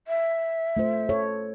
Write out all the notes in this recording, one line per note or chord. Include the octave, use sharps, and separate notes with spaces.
E5
A3 F4 C5
A4 C#5